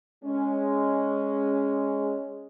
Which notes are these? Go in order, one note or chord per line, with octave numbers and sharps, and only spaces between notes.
G#3 C#4